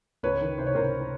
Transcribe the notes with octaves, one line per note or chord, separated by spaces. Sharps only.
C#2 B4 C#5
D#3
C3 C5
C#5
C#2 A#4 C5